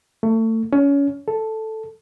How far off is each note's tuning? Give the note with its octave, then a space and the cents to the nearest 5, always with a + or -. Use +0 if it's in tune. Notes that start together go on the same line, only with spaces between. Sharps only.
A3 +30
C#4 +25
A4 +0